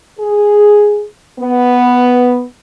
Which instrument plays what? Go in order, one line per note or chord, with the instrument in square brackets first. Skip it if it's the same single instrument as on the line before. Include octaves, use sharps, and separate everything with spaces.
[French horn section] G#4
B3